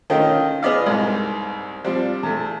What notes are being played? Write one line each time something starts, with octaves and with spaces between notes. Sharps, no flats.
D#3 A3 C#4 F4 D#5
B3 G#4 B4 D5 D#5 F5
C2 G#2
F3 G3 C4 D4
E2 A3